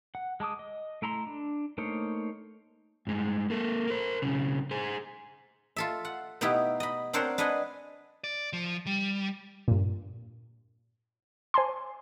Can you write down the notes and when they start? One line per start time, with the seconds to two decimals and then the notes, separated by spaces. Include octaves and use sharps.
0.15 F#5
0.40 G#3 A5 D6 D#6
0.59 D#5
1.02 A3 E4 A#5 C6
1.27 D4
1.78 A3 A#3 D#4 C5 C#5
3.07 G2 G#3
3.50 A#3 A4
3.88 A#4 C5
4.22 B1 C#3
4.71 G#4 C5
5.76 F4 A4 E5
6.05 F#5
6.41 B2 B3 D#4 E4 G4
6.80 D#5 B5
7.13 C4 D4 A#4 C5 C#5 F#5
7.38 D4 B4 D#5 F#5 G#5
8.24 D5
8.53 F3
8.86 G3
9.68 G2 A#2
11.54 C5 G#5 A5 C6